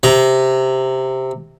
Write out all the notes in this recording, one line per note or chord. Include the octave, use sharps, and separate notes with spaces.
C3 A#5